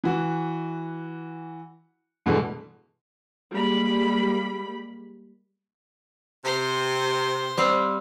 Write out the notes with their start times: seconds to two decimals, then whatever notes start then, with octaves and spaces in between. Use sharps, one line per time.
0.04 E3 F#4
2.26 G2 B2 E3 G#3 A3
3.52 G3 G#3 A#3 B5
6.45 C3 C5
7.57 G3 C4 F5